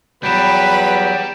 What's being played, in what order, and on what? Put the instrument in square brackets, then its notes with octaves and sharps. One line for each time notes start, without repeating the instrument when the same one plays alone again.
[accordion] E2 F#3 [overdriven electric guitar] G3 G4 [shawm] B4 [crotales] G6 D7 E7